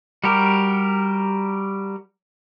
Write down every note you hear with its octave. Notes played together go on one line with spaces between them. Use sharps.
G3 F#4 G4 A#4